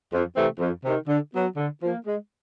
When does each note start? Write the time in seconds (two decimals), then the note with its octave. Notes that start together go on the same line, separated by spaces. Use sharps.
0.12 F2
0.35 C3 E3 A3 C4
0.59 F2
0.84 C3 D#3
1.08 D3
1.33 F#3 B3
1.56 D3
1.81 F3 A#3
2.06 G#3